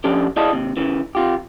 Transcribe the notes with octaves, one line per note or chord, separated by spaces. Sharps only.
F3 C#4 D4 G4 A4
E4 G#4 D5 D#5 F5 A5
D#2 C3
C#3 E3
C3 F4 G4